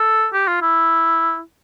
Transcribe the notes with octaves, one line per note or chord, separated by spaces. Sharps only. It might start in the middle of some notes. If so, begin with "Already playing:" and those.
Already playing: A4
G4
F4
E4